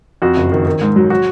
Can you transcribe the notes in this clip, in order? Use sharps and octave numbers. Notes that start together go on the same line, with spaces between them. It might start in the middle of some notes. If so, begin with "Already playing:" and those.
F2 F#4
F#1
D#3
D#3
G#2
F#3
F#4